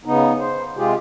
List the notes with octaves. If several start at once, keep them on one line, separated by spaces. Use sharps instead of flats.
C#3 B3 D#4
C5
C3 G#3 F4 G4 G#4